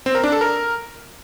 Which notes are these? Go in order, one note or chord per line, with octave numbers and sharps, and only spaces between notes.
C4
A#4
D4
A4
A#4